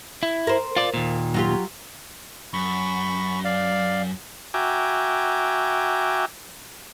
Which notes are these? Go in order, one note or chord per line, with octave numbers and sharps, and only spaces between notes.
E4
A#4 C5
F4 D5
D#2 A#2
F#3 F4 G4
F#2 B5 C#6
D5 F5
F#4 E5 G5 G#5 A#5 D6